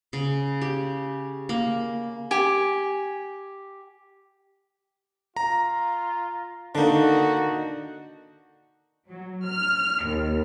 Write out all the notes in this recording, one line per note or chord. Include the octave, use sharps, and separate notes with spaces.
C#3
G4
A#3
G4 G#5
F4 A#5
D3 A#3 D4 D#4 F#4
F#3
F6
D#2